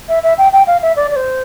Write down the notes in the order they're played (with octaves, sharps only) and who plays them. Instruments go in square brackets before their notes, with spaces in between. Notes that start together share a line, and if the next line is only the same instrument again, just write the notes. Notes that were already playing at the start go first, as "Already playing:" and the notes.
[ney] E5
E5
G5
G5
F5
E5
D5
D5
C5